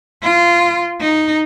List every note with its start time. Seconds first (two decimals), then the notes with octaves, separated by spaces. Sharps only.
0.22 F4
1.01 D#4